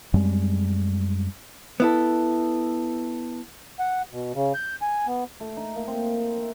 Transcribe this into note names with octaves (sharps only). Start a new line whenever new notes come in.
F#2 G3 G#3 C4
B3 E4 A4
F#5
B2
C#3
G6
G#5
B3
A3
D#4
A#3
C4
E5